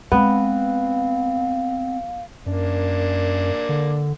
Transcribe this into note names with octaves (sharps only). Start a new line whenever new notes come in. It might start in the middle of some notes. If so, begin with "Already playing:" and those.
G#3 B3 C4 F5
F#2 A#3 D4
D3